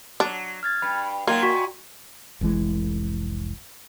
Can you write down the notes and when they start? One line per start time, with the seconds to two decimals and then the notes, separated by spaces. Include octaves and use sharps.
0.20 F#3 D4
0.63 F6 G#6 A6
0.82 G2 B5
1.27 F#3 A#3 D#4 F4 G5 C6 G#6
1.43 A#2 F#4
2.41 F1 C2 E3 G#3